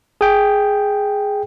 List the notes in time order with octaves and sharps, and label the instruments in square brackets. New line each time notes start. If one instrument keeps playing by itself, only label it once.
[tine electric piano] G#4 G5